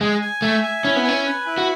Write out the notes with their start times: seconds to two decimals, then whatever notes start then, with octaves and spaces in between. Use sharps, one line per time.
0.01 G#3 G#5
0.21 G#5
0.42 A3 E5
0.63 G#5
0.84 C#4 E4
0.96 B3
1.05 C#4 G#5
1.25 B4
1.46 E4
1.58 F#4